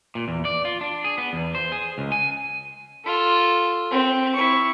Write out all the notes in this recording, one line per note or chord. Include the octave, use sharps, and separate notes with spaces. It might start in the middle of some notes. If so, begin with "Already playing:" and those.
A#2
E2
D5
F4
D4
G#4
B3
E2
C5
G#4
C#2
G#5
F4 A4
C4
E4 C#6